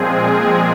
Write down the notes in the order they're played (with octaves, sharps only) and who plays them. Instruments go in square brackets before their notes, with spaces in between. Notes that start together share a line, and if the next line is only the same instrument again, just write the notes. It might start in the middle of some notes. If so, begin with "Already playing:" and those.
Already playing: [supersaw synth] A#2 F3 G#3 C4 G#4